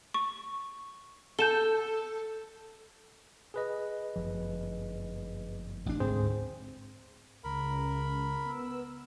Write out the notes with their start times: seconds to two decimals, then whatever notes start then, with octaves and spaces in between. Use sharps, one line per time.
0.14 C#6
1.39 A4 G6 E7 G7
3.54 G#4 B4 D#5
4.16 G1 F#2 F3
5.86 A1 D4
6.00 D2 G#2 C4 G#4 C5
7.44 C#2 C#3 A#4 B5
8.45 B3 E6